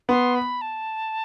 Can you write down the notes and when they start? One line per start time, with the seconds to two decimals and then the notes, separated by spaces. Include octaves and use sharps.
0.09 B3 C6
0.35 B5
0.61 A5